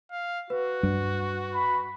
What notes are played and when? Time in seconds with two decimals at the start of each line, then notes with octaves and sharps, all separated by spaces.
0.11 F5
0.50 F#4 B4
0.83 G2 G3 D4
1.54 B5